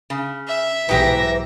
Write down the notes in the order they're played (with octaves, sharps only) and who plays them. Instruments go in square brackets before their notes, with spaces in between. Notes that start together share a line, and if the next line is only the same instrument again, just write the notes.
[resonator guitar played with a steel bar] C#3
[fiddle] E5
[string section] B1 E3 A#6 [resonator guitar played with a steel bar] G#2 G4 G5 [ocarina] B4